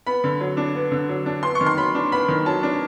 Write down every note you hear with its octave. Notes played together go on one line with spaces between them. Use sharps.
B3 B5
D3
F#3
D4
B3
D3
F#3
D4
B3 C6
C#6
D#3
C6
F#3 B5
D4
B3 B5
D#3
F#3 A5
D4